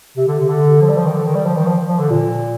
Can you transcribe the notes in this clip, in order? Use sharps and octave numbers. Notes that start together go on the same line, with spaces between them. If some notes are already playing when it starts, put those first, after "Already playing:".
C3
D3
C3
D3
F3
G3
F3
D#3
D3
D#3
G3
F3
D#3
F3
F3
D3
A#2